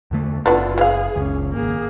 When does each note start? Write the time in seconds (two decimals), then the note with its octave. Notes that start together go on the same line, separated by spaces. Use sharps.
0.11 E2 D3 A3
0.46 F#1 B3 D4 E4 F4 A4
0.78 E3 G#4 F5
1.16 F#1 C#2 C#4
1.54 G#1 A#3 G#4